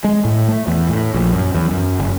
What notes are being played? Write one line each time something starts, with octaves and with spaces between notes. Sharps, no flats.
G#3
A2
A3
E2
A2
A#1
F#2
E2
F#2
F#1